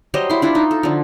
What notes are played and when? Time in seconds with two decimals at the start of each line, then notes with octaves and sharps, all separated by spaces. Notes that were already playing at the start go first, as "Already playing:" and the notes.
0.14 F#3 G3 C5 D#5
0.30 E4 C6
0.42 D4 E4 F4
0.55 D#4
0.71 A4
0.83 D3 F3